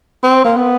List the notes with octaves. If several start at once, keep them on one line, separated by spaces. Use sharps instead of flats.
C4
A#3
B3